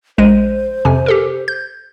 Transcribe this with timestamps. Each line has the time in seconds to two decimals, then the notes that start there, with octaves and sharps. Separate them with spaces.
0.18 A#1 G#3 C5 D#7
0.85 F2 C3 G#5
1.06 G4 A4 A#4
1.48 G6